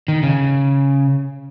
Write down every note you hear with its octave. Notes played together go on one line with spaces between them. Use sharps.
D#3
C#3